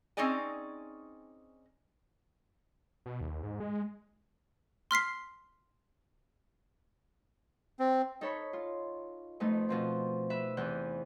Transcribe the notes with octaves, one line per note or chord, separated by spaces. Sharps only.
C4 C#4 D#4 G#4 D5 G#5
B2
D#2
G#2
G#3
C6 F6 B6 C7
C4
D#4 A4 C#5 B5
F4
F2 A3 B3 D#4
B2 F3 C4
B4 E5
E2 C3 E3 B3 F#6 G6